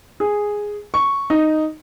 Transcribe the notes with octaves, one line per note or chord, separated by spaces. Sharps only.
G#4
C#6
D#4